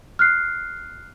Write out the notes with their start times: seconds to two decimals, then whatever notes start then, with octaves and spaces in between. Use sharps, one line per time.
0.19 F6 F#6 C7